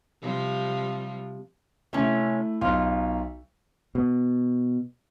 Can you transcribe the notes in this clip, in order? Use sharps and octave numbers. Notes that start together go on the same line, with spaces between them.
C3 F3 G3
C3 A3 C#4 E4
B1 F4
B2